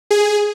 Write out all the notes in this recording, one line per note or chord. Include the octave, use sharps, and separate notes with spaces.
G#4